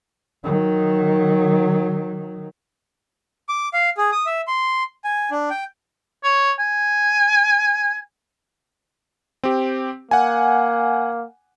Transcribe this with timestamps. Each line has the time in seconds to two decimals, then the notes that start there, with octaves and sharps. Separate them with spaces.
0.44 D#3 F#3
3.49 D6
3.74 F5
3.97 G#4
4.12 D#6
4.26 E5
4.47 C6
5.04 G#5
5.31 D4
5.50 G5
6.24 C#5
6.59 G#5
9.44 C4 G4
10.11 A#3 F#5 G#5